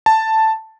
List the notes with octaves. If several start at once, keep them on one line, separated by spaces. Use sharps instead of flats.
A5